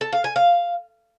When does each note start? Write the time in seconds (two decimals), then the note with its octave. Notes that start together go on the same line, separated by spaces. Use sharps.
0.01 A4
0.13 F5
0.24 G#5
0.36 F5